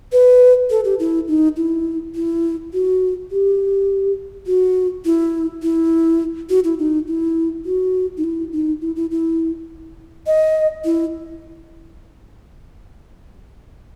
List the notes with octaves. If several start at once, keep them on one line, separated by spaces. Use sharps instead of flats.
B4
A4
G4
E4
D#4
E4
E4
F#4
G4
F#4
E4
E4
F#4
E4
D#4
E4
F#4
D#4
E4
D#4
E4
E4
E4
D#5
E4